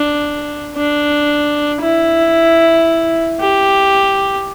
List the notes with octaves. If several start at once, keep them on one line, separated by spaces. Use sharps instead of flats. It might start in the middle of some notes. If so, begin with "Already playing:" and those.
Already playing: D4
D4
E4
G4